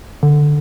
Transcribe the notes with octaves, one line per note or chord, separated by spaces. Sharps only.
D3